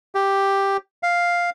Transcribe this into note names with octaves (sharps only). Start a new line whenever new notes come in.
G4
F5